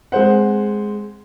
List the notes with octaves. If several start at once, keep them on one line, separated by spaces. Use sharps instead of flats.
G#3 C4 C5 F#5